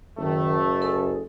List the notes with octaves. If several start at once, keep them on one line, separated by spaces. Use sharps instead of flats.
F#1 D#3 A3
G#4 A4